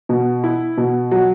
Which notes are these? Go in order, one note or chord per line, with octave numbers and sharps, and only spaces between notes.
B2
E4
B2
F#3